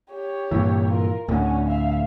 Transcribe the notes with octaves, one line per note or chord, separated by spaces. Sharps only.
G4 C#5
G2 A#2 E3
F4 A#4
D2 A2 D3 C#4 F#4
E5 F5